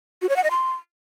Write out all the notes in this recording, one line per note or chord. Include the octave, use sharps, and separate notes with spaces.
F#4
C#5
F#5
D#5
C6